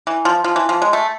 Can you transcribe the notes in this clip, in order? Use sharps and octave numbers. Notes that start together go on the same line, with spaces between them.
E3
F3
F3
E3
F3
G#3
A3